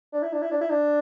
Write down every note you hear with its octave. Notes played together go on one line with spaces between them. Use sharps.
D4
E4
D4
E4
D4
E4
D4